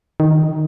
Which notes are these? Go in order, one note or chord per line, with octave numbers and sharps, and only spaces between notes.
D#3